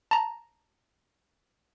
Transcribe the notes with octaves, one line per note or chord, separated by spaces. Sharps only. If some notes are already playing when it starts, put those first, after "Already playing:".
A5 A#5